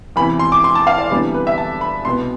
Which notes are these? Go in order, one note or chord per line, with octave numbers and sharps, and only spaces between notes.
E2 C3 E3 B5
C6
D6
C6
A5
F5
D5
D2 C3 E3 G3 B3 D5
B4
E5
A5
B5
C2 B2 B3 C6